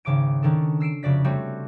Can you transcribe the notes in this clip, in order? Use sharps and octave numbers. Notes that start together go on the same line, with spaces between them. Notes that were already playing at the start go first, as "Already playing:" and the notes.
G#1 C#3 D6 D7
D#3 C#4 D4 A4
E6 C7 D7 E7
F1 C#3 F#4 D5 B6
G3 A3 C4 F#4 C#5